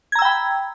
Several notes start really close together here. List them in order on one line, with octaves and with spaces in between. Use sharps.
G#6 A#5 E6 G5 B5